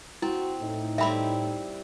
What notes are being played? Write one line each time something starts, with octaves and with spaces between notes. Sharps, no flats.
C4 E4 F#4
A2 D#4
G3 C4 E4 E5 B5